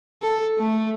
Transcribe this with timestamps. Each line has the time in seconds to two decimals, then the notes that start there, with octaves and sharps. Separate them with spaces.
0.22 A4
0.59 A3